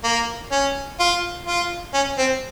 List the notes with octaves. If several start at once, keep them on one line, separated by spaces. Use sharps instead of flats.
A#3
C#4
F4
F4
C#4
C4